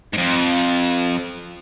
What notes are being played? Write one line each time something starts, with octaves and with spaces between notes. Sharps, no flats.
F2 G#2